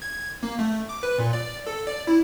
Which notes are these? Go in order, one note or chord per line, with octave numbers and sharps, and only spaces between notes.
G#6
A#3
A3
D6
B4
A#2
D5
A4
D5
E4